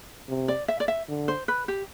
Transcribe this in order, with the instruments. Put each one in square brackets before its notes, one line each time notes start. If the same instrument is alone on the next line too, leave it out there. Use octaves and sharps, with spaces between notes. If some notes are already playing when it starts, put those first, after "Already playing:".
[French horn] C3
[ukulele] D5
E5
D5
E5
[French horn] D3
[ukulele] C5
B4
G4